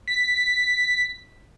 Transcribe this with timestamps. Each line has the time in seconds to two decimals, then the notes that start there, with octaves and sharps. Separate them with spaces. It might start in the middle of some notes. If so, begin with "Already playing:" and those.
0.08 B6